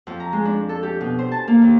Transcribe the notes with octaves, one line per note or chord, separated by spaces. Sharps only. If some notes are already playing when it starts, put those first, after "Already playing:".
F2
A#5
G#3
D4
A4
G4
B2
C5
A5
A#3
D#2